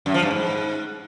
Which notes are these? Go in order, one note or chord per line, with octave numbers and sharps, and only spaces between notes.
F#2
F3
G2
G#2